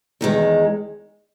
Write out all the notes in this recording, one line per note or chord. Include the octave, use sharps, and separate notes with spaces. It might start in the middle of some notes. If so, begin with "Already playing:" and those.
E2 D#3 G#3